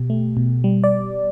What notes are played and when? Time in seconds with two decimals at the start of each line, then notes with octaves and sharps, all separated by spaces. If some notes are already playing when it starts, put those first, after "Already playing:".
Already playing: B2 G4
0.10 A3
0.37 B2
0.64 G3
0.84 D5